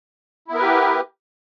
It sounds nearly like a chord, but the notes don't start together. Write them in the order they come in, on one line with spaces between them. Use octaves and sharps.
E4 B3 A#4 B4 G4